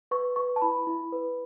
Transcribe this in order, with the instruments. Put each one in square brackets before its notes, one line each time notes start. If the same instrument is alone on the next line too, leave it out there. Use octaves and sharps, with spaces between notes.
[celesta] B4 C#6
B4 C#6
A5
E4 B5
E4
B4